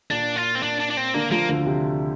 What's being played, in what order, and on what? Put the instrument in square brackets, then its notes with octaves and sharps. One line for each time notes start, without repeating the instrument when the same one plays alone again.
[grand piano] A#2 A#3 [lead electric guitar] D4
[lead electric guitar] F4
C4
D4
D4
D4
C4
[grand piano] D3 D4 [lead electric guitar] A#3
[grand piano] F3 F4 [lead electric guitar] A#3
[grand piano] D2 D3
C3